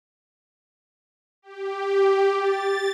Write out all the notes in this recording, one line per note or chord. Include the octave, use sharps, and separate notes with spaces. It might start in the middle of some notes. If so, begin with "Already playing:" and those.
G4
A6